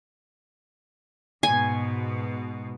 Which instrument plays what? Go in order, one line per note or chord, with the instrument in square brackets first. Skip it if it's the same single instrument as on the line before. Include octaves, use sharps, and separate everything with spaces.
[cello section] G#2 B2 [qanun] G#5